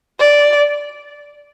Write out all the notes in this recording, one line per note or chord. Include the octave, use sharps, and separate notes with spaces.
D5